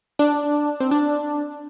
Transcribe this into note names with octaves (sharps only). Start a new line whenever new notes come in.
D4
C4
D4